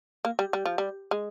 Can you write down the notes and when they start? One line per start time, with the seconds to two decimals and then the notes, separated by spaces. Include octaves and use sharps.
0.25 A#3
0.39 G3
0.53 G3
0.65 F3
0.78 G3
1.11 G#3